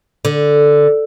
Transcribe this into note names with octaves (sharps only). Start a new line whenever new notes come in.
D3